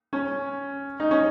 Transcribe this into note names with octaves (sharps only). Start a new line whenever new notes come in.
C#4
D#4
C#4